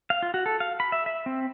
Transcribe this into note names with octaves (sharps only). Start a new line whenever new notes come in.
F5
F4
F#4
A4
F5
B5
E5
E5
C4